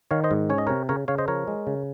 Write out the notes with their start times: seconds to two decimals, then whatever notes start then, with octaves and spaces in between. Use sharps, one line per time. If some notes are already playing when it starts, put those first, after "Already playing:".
0.11 D#3 C#5 F5
0.24 C5 D#5
0.31 G#2
0.50 C#4 C#5
0.58 D#5
0.67 C3 A#4 C#5
0.89 C#3 A#4 C#5
1.08 C#3 C#5 F5
1.18 C5 D#5
1.28 F3 A#4 C#5
1.48 G#3
1.67 C#3